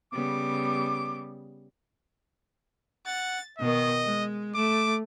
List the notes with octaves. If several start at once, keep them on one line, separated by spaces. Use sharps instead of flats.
C#3 G3 B3 D6
F#5 A6
B2 D#3 D#5
G#3
A3 D6